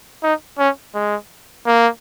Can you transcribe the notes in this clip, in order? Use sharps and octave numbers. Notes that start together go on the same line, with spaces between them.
D#4
C#4
G#3
A#3